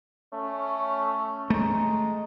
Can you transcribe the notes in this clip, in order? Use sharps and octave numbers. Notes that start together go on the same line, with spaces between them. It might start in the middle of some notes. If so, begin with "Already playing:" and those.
A3 C#4
G#3 A3 A#5